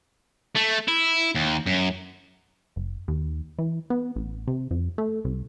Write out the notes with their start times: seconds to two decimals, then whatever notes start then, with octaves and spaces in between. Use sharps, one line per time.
0.56 A3
0.88 E4
1.35 D#2
1.66 F#2
2.76 F#1
3.08 D#2
3.59 E3
3.90 B3
4.16 A1
4.47 C3
4.71 F2
4.98 A3
5.24 C2